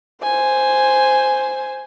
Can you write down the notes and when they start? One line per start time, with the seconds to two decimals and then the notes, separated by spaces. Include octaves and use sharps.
0.23 C5 G#5